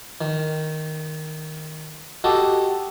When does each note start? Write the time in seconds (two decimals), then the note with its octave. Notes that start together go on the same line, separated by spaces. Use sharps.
0.21 D#3
2.24 F#4 G4 A4 D#5